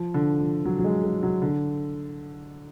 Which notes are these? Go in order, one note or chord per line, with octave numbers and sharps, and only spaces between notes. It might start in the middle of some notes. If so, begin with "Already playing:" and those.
Already playing: F3
D3
F3
F#3
F#3
G#3
G#3
F#3
D3